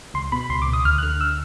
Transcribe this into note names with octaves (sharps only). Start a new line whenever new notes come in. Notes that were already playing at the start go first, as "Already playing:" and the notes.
C#2 C6
B2 B5
C#2 C6
D6
B2
D#6
D2 F6
F#6
D3 F6
E6